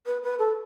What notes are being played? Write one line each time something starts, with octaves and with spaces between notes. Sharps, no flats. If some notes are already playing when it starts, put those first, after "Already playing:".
B4
B4
A4